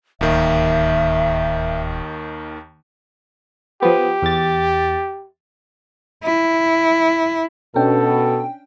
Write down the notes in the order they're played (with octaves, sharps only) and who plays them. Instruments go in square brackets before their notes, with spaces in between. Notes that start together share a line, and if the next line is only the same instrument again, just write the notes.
[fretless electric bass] D1 [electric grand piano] D#2 D#3 [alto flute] E5
[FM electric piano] F3 B3 [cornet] G4
[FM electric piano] E2 A6
[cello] E4
[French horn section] B2 [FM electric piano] C#4 D4 G5 [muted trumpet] A4